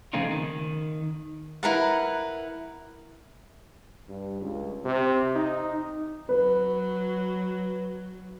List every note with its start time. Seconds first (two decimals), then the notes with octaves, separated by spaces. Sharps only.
0.13 C#3 F3 A3 C4 D#4 F4
0.31 D#3
1.63 E4 A#4 B4 F#5
4.08 G2
4.41 C#2
4.85 C3
5.35 D#4
6.29 F#3 B4